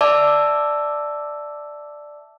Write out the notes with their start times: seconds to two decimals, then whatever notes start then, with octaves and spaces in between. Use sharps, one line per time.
0.01 D5 E5 A5 D6 E6